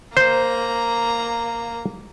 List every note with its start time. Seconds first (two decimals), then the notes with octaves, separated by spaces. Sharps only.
0.17 A#3 C5 A#5